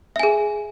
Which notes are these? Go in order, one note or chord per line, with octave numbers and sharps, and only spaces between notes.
G#4 E5 G#5